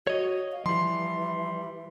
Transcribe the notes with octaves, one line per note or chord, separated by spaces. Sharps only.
F#4 C#5 D#5
F5
E3 F3 G3 C6